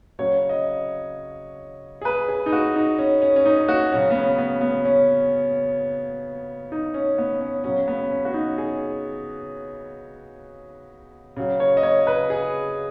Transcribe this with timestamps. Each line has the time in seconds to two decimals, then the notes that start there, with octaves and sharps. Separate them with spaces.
0.19 C#3 F#3 C#5
0.49 D#5
2.01 G#4
2.05 B4
2.28 G#4
2.46 D#4
2.53 F#4
2.76 D#4
2.98 C#4
3.22 C#4
3.36 C#4
3.46 D#4
3.69 F#4
3.92 C#3 F#3 C#4
4.10 B3
4.15 C#4
4.38 B3
4.61 B3
4.85 C#4
6.72 D#4
6.94 C#4
7.18 B3
7.41 C#4
7.64 C#3 F#3 C#4
7.88 B3
8.11 C#4
8.25 F#4
8.34 D#4
8.58 G#4
11.37 C#3 F#3
11.60 C#5
11.77 D#5
11.83 C#5
12.07 B4
12.30 G#4